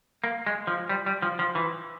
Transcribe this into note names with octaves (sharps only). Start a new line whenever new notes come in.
A#3
G#3
F3
G3
G3
F3
F3
E3